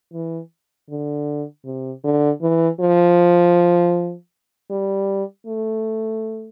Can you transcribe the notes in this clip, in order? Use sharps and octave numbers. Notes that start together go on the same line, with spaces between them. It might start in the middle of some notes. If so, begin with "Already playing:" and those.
E3
D3
C3
D3
E3
F3
G3
A3